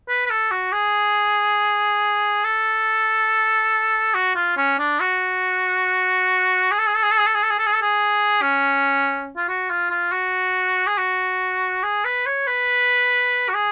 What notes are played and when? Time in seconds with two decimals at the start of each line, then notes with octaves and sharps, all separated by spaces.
0.08 B4
0.26 B4
0.30 A4
0.51 F#4
0.72 G#4
2.44 A4
4.14 F#4
4.35 F4
4.57 C#4
4.79 D4
5.00 F#4
6.71 G#4
6.78 A4
6.87 G#4
6.95 A4
7.03 G#4
7.11 A4
7.19 G#4
7.26 A4
7.34 G#4
7.42 A4
7.50 G#4
7.58 A4
7.66 G#4
7.74 A4
7.82 G#4
8.41 C#4
9.37 F4
9.49 F#4
9.70 F4
9.91 F4
10.12 F#4
10.87 G#4
10.98 F#4
11.83 G#4
12.05 B4
12.26 C#5
12.47 B4
13.48 F#4
13.54 G#4